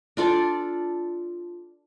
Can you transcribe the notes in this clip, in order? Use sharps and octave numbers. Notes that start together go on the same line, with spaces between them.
D4 F4 A4 D5